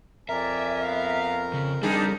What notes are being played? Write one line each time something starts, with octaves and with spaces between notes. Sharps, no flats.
F2 A#4 D5 E5 G#5 A#5
B3 F5
C#3
G3 D4 D#4 F4 G#4 D5 A5